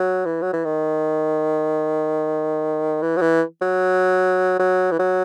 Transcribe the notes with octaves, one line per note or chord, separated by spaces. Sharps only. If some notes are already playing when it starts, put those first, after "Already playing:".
Already playing: F#3
E3
F#3
E3
D#3
E3
F#3
E3
F#3
F#3
E3
F#3